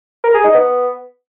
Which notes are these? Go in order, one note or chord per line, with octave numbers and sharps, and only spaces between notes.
A#4
G#4
D#4
B3